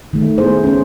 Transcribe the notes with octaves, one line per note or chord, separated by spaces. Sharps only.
D#3 A3
A3 B3 E4 G#4 C5
C#4 C5